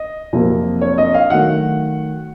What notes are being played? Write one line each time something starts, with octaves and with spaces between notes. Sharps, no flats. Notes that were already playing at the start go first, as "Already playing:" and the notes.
Already playing: D#5
F2 C3 F#3 A#3
C#5
D#5
F5
D#3 F#3 A3 F#5